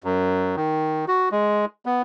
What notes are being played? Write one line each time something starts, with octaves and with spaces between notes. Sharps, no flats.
F#2
D#3
F#4
G#3
B3